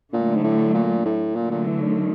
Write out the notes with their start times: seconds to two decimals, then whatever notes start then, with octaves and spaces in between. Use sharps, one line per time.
0.13 A#2 D3 F#3 A3
0.35 G#2
0.44 A2
0.74 A#2
1.05 A2
1.35 A#2 D3 F#3 A3
1.51 A#2
1.66 E3
1.81 D#3